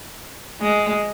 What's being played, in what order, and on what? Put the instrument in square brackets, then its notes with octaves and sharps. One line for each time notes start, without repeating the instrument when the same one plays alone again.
[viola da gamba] G#3